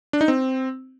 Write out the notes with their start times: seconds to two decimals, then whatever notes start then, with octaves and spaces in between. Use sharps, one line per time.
0.13 D4
0.21 D#4
0.28 C4